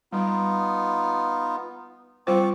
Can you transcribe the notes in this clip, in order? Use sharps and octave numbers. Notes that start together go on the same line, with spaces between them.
G3 B3 D#4 F4 F5
G3 C4 F4 C5 C#6 D6